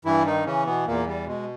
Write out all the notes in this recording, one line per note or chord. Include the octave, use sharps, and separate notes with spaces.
G2 E3 E4
D#3 D#4
C#3 E3 C#4
B2 B3
E2 A#2 A#3
G3
B2 G#3